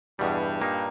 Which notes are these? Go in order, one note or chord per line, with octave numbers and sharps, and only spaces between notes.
E2 G2 B2 G3
A#2 A#3 D#4